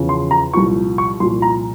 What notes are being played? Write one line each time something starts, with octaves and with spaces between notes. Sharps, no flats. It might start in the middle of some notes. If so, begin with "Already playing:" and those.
Already playing: E2 C#3 F3
C6
A#5
C2 A#2 F3 C#6
C#6
C2 A#2 F3 C6
A#5